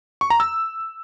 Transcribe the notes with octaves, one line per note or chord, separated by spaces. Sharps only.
C#6
A#5
E6